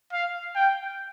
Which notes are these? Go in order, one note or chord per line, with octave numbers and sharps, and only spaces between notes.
F5
G5